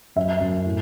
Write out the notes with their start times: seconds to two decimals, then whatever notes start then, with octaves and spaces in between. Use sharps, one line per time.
0.16 F#2 E5
0.40 F#2
0.65 A2